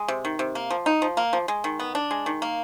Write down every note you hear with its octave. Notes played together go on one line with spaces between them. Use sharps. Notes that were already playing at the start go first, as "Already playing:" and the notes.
Already playing: G#3
C3
D#3
C3
A#3
F3
D#4
F3
A#3
F3
G#3
D#3
B3
D4
G#3
D#3
A#3